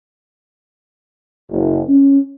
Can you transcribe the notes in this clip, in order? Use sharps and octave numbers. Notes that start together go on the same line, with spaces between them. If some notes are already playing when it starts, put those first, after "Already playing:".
F#1
C#4